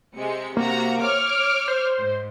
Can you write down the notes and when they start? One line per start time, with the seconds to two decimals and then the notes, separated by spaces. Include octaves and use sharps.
0.16 C3 G#3 C#7
0.57 C3 A#3 F#4 A#5
1.00 C#5 D6 F6
1.29 D7
1.68 C5
2.00 G#2